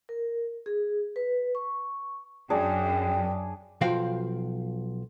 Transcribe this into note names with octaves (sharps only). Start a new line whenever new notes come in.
A#4
G#4
B4
C#6
F#2 D4 G#4 D5 G5
B1 F3 F#4 C5 F5 G5